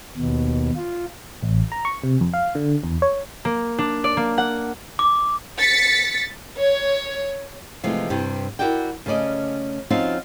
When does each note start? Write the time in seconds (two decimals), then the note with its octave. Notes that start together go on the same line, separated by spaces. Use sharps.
0.17 D#2 B2
0.76 F4
1.43 A1
1.72 A#5
1.85 C#6
2.04 C3
2.21 F2
2.34 F5
2.55 D3
2.84 E2
3.02 C#5
3.45 A#3
3.78 D4
4.04 D5
4.17 A#3
4.38 F#5
4.99 D6
5.60 A6 B6 C#7
6.57 C#5
7.84 C3 E3 F3 G#3 A3
8.10 G2 C3
8.59 E4 F#4 A#4 D5 G5
9.06 C#3 A3 C#4 D5 D#5
9.90 F3 C4 C#4 D#4 F4 F#4